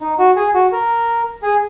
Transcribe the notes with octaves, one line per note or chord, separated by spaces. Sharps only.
D#4
F#4
G#4
F#4
A#4
G#4